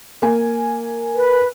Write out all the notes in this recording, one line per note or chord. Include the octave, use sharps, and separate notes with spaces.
A#3 G#5
B4